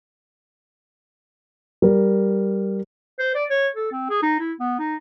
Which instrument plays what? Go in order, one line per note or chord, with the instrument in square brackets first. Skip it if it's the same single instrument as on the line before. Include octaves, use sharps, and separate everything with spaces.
[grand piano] G3 A#4
[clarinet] C5
D5
C#5
A4
C4
G#4
D#4
E4
B3
D#4